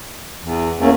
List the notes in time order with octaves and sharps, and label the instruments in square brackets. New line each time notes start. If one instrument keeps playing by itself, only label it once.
[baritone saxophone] E2
[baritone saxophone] E2 [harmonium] A#3 C#4